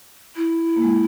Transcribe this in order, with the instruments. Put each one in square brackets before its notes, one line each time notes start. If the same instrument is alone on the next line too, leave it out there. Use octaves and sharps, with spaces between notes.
[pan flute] E4
[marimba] A#3
G#3